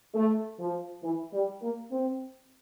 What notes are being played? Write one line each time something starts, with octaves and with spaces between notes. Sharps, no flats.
A3
F3
E3
G3
A#3
C4